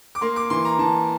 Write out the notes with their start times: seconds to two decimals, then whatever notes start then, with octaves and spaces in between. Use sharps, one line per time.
0.15 D6
0.21 A#3 C6
0.36 D6
0.50 E3 C6
0.65 A#5
0.79 E3 A5